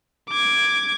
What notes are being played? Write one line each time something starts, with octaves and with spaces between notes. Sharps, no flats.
D6 G#6